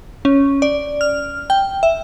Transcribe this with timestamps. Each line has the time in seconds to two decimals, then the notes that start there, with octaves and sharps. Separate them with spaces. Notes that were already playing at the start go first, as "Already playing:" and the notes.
0.25 C#4
0.62 D5
1.01 F6
1.50 G5
1.83 E5